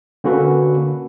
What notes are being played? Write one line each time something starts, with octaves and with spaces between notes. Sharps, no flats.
D3 A#3 C#4 F#4 A4 B4